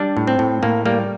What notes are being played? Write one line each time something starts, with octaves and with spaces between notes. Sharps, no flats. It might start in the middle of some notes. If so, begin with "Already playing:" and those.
Already playing: G3 D4
A2
C4
A2
A2 A#3
G3 A#3